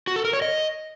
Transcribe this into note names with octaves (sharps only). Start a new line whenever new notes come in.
F#4
A4
A#4
C#5
D#5